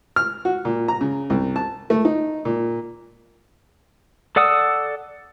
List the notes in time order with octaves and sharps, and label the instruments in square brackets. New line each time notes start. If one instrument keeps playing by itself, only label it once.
[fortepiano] F6
F#4
A#2
A#5
C#3
C2
A5
A3
D#4
A#2
[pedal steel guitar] A4 D5 F#5 D#6 E6